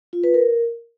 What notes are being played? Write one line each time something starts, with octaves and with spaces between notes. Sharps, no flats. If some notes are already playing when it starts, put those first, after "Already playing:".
F4
B4
A#4